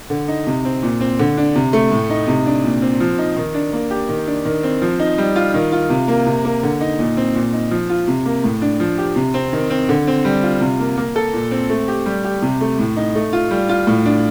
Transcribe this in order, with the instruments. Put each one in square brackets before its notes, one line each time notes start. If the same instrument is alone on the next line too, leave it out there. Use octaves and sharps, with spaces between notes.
[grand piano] D3
D#4
C3
C4
A#2
C4
D3
D4
C3
A3
A2
D#4
C3
D4
A#2
C4
F3
D#4
D#3
D4
A#3
G4
D#3
D4
D#3
C4
F3
D#4
G3
F4
D#3
F4
C3
A#3
C3
A#3
D3
D#4
A#2
C4
A#2
D#4
F3
F4
C3
A#3
A2
D4
F3
G4
C3
C4
D#3
C4
D3
C4
G3
F4
C3
A#3
A#3
A4
A#2
C4
A3
G4
G3
G4
C3
A3
A2
D#4
A3
F4
G3
F4
A2
D4